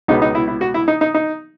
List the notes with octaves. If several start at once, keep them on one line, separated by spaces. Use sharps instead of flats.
C#2 B2 G#3 B3 D#4
D#4
E4
E4
F#4
E4
D#4
D#4
D#4